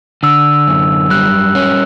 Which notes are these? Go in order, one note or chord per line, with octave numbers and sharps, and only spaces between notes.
D3 E6
F#2
G3 F#6
C#4